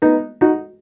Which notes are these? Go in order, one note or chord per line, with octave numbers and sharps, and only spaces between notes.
B3 D#4
D#4 F#4